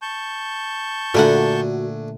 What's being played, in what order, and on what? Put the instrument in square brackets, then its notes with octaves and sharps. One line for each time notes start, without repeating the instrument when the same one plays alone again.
[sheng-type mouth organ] A5 C#6 G6
[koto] A#2 D3 F#5 [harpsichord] A3 D4 G#5 [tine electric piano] F#4